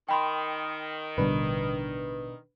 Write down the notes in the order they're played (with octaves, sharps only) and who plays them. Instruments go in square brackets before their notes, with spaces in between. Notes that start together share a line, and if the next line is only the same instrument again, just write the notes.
[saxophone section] D#3 [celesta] G5 B5 C6
[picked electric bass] A1 D3 G3 [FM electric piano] B2 D4 B4